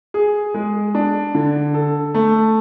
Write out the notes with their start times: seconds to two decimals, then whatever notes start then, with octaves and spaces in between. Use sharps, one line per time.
0.14 G#4
0.54 G#3
0.95 D4
1.35 D3
1.74 A4
2.14 A3